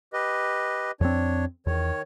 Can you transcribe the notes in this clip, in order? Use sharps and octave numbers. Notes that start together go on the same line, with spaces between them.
G4 B4 D#5
F2 C4 D4 C#5
E2 D#3 C#5